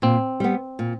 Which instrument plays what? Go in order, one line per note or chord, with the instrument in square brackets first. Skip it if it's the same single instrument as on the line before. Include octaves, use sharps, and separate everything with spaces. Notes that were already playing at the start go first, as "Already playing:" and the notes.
[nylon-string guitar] A#2 [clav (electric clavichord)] C4
[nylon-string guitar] G3 B3
A#2